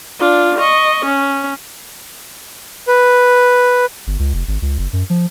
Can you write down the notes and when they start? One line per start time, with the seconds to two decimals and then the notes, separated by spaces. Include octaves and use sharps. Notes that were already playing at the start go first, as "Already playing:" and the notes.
0.19 D4 F4
0.59 D#5 C#6
1.05 C#4
2.88 B4
4.07 G1
4.19 C#2
4.34 F1
4.48 G#1
4.62 C#2
4.78 F#1
4.93 F#2
5.10 F3